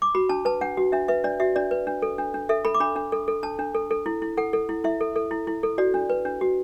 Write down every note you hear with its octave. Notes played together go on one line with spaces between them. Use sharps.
D6
F#4 B5
D4 A5
B4 A5
D4 F#5
F#4
D4 E5
B4 E5
D4 D5
F#4 E5
D4 D5
B4
D4
A4
D4
D4
A4 E5
A4 B5
D6
D4 B5
D4
A4
A4
D4 A5
D4
A4
A4
E4
E4
A4 F#5
A4
E4
E4 E5
A4
A4
E4
E4
A4
F#4 D5
D4
B4
D4
F#4